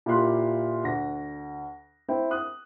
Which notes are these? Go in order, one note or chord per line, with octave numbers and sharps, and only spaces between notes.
A#2 E4 F4 G4 C6 F#6
D2 A#6
C4 E4 G5
D#6 F#6